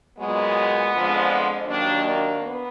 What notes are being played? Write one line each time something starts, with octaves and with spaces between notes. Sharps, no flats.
A#2 F#3 G#3 B3
F2 D3 F3 G#3
D#2 D#3 F#3 A#3 D4
A#3 D4
B3